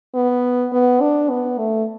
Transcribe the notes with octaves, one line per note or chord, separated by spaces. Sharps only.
B3
B3
D4
B3
A3